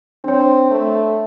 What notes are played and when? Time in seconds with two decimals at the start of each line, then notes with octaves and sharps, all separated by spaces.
0.24 C4 D4 C#5
0.71 A3